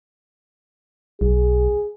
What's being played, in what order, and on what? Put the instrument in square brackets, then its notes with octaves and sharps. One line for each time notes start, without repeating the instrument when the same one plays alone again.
[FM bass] B1 [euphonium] G#4